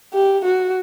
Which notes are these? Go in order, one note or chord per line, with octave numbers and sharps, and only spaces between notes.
G4
F#4